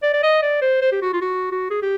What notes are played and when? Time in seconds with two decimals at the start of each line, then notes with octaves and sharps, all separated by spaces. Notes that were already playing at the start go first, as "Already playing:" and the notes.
0.02 D5
0.13 D5
0.23 D#5
0.42 D5
0.62 C5
0.82 C5
0.92 G4
1.02 F#4
1.13 F4
1.21 F#4
1.52 F#4
1.70 G#4
1.82 G4